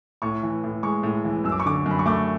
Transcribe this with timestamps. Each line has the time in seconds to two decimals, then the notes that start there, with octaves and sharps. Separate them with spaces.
0.22 A2 C#6
0.43 E3
0.64 A2
0.83 G#3 C#6
1.03 A2
1.25 E3
1.44 F#2 E6
1.52 D6
1.60 C#6
1.65 D3 D6
1.86 F#2
1.91 B5
1.99 C#6
2.06 A3 D6